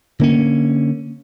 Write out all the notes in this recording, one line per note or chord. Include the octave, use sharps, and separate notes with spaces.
D3 A#3 C#4